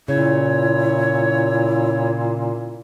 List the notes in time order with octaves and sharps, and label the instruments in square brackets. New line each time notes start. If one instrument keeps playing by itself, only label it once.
[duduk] A#2 [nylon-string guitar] C#3 [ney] E4 [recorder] C#5